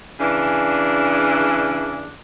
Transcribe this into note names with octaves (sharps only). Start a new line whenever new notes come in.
C#3 E3 D4